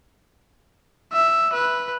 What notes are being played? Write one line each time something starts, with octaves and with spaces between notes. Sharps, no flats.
E5
B4